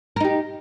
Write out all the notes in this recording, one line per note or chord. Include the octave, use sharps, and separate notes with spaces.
D#4 G4 A#4